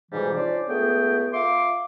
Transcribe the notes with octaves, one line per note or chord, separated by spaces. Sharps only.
F2 G#2 B2 E3 G3
C#4 D4 F4 C5 D5
C#2 A3 B3 G#4 G5
F4 E5 C6 D6